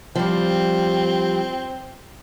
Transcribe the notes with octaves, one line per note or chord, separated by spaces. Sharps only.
F3 G3 C4